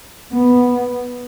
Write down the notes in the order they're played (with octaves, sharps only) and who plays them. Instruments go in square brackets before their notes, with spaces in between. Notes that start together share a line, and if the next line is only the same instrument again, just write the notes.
[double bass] B3